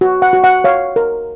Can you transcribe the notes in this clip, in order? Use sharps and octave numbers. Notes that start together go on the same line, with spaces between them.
F#4
F#5
F#4
F#5
C#5 F5
A#4